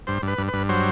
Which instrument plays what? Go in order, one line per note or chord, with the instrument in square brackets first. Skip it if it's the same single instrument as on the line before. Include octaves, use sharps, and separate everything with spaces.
[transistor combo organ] G2 C5
G2
B4
G2
G2 B4
F#3 C5